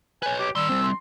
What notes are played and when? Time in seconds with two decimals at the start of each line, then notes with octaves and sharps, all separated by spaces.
0.22 B4 C#5 G#5
0.39 G4 D6
0.55 D#3 G3 C6 E6
0.69 G3 C4 C5
0.83 C6